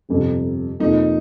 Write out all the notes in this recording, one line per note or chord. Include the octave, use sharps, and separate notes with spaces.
G1 F2 C3
F2 C3 F3 A#3 D#4